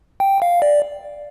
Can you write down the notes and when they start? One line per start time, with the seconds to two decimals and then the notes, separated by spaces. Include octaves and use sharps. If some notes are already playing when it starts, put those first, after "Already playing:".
0.20 G5
0.42 F5
0.62 D5